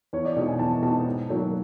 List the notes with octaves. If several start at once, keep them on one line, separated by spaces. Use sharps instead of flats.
E2 C#5
D5
B2 G#3 C4 D#4 D#5
G#5
E2 A5
B2 G#3 C4 D#4 A5
G#2
D#3 F#3 A#3